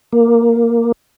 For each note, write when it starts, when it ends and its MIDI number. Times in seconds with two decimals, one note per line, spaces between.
0.13 0.92 58